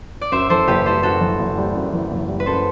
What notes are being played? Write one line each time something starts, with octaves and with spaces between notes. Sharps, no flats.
D5
F#2 C5 E5
E3 A4 C5
F#1 G4 B4
G3 A4 C5
F#2 F#4 A4
E3
F#1
G3
F#2
E3
F#1
G3
B4
F#2 A4 C5